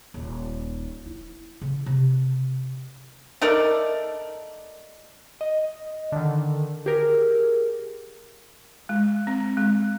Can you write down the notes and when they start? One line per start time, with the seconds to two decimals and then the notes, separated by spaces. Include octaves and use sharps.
0.14 D#1
1.06 E4
1.62 C#3
1.86 C3
3.41 A3 D#4 A#4 D5
5.41 D#5
6.12 D3 D#3
6.86 G4 G#4 A#4
8.89 G#3
9.27 C4
9.57 G#3